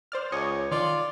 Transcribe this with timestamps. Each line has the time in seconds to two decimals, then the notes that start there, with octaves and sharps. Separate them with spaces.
0.12 C5 D5 F6
0.32 C#2 C#5 D#5
0.71 D#3 F4 D5